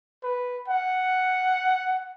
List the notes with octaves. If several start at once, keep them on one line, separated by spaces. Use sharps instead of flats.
B4
F#5